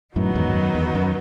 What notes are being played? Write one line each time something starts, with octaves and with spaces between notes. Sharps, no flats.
F#2 A2 D#3 F#3 B3 D#4
E2 G#2
F#2
E2
F#2